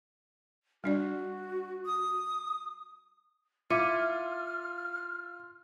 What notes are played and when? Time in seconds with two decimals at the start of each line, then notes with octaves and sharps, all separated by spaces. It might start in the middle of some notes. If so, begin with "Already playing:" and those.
0.84 G3 D4 F#4 D5
1.86 D#6
3.70 E4 F4 D6 F6 C#7 D#7